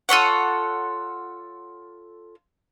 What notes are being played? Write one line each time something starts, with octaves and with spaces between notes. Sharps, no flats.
F4 A4 C#5 F#5